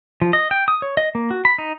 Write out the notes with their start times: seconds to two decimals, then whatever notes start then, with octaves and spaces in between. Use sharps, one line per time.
0.22 F3
0.33 D#5
0.51 G5
0.68 D#6
0.82 C#5
0.97 D#5
1.15 A#3
1.31 F#4
1.45 B5
1.58 D#4